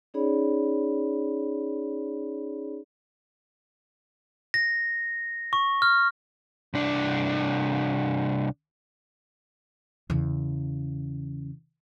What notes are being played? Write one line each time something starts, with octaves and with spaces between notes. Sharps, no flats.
C#4 D#4 G#4 C#5 D5 B5
A#6
C#6
F6
C2 D4
E2 C#3